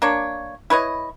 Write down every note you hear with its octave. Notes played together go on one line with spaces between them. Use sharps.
A#3 D4 C#5
E4 B4 C#5 D#5